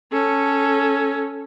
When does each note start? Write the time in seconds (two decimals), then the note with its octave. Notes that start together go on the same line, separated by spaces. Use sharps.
0.12 C#4 A4